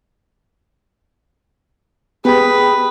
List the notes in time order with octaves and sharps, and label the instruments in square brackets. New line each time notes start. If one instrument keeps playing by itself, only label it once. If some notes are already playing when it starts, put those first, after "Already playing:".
[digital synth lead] B3 [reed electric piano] G4 G5 B5 [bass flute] G#4 [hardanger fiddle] B4